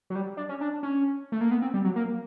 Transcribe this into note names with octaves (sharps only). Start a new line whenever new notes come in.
F#3
G3
D4
C#4
D4
C#4
A3
A#3
B3
C4
G3
F#3
A#3